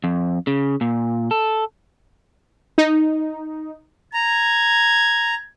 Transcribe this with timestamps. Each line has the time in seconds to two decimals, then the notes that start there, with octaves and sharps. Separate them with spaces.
0.04 F2
0.47 C#3
0.81 A#2
1.31 A4
2.78 D#4
4.13 A#5 G#6